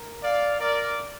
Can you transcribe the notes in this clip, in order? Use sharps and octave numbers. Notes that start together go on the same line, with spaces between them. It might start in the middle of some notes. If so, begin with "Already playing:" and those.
Already playing: A#4
D5 F5
A#4 D5